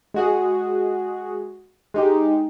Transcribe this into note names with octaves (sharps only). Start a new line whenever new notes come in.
G#3 F#4 G#4
G#3 D#4 G4